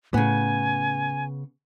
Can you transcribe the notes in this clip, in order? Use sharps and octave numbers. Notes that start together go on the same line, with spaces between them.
A2 C#3 B3 G#5